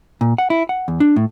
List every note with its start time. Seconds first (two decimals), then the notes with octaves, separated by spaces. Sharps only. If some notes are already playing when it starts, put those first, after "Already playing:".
0.21 A#2
0.38 F#5
0.50 E4
0.69 F#5
0.88 E2
1.00 D4
1.16 A2